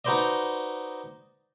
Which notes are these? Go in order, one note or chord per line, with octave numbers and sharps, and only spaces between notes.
D#4 F#4 B4 C5 D5 D#5